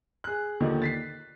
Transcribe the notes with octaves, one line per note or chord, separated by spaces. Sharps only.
G#4 F#6
D#2 A#2 D3 D#3 F3
A6 B6 C7